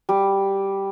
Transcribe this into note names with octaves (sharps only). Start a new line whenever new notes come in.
G3